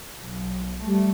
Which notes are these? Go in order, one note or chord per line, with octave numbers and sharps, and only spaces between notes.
B1
G3 A3